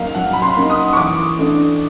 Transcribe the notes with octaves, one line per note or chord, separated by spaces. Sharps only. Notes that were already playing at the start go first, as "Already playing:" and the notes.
Already playing: F#3 A#3 D#4 F5
F#3 F#5
B5
C6
A#3 D#4
D#6
C#6
E3 D6
A3 D4